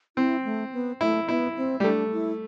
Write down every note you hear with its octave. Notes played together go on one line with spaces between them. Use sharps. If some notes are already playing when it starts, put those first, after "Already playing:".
C4 E4
A3
B3
A3 E4
B3 E4
C4
G3
A3 D4
E4